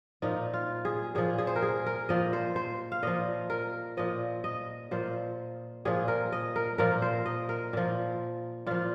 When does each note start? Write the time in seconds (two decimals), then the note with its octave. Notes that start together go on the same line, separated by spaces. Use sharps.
0.22 A#2 F3 D#4
0.54 F4
0.85 G#4
1.15 A#2 F3 G#4
1.38 G#4
1.47 C5
1.56 A#4
1.62 G#4
1.86 A#4
2.09 A#2 F3 D#5
2.33 C5
2.56 C5
2.92 F5
3.03 A#2 F3 D#5
3.50 A#4
3.97 A#2 F3 D#5
4.44 D#5
4.91 A#2 F3 C5
5.85 A#2 F3 G#4
6.08 A#4
6.32 D#5
6.56 A#4
6.78 A#2 F3 A#4
7.02 C5
7.26 D#5
7.49 A#4
7.73 A#2 F3
8.67 A#2 F3 F4